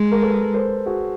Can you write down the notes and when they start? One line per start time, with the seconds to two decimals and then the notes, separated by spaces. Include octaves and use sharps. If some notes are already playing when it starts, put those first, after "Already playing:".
Already playing: G#3
0.11 A#4
0.23 A4 B4
0.54 A#4 C5
0.86 F#4 G#4